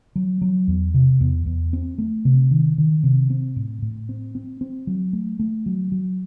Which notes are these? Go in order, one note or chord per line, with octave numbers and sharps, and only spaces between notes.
F#3
F#3
E2
C3
E2
E2
C4
A3
C3
D#3
D#3
C3
C4
A2
A2
C4
C4
C4
F#3
A3
A3
F#3
F#3